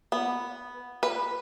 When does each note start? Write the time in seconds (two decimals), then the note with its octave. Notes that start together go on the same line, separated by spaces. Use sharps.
0.12 B3
1.03 B4